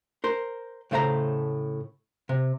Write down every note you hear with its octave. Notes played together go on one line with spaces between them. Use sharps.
A#4 C5
A2 C#3 A3 C5 E5 A#5
C3